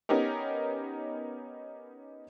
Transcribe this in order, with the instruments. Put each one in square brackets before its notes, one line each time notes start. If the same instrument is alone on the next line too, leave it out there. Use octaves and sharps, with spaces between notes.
[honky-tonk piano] B3 C#4 D#4 G4 A#4